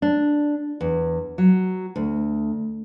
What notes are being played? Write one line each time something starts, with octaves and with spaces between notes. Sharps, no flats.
D4
E2
F#3
D2